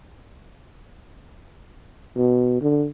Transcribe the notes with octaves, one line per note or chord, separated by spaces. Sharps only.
B2
D3